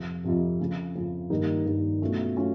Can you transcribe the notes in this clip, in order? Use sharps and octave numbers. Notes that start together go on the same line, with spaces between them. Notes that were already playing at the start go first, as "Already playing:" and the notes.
Already playing: F2 C3 F3
F2 C3 F3
F2 C#3 F3
F2 C#3 F3
G2 D#3 G3 A#3 D#4
G2 D#3 G3 A#3 D#4
B2 F#3 A3 C#4 F4
B2 F#3 A3 C#4 F4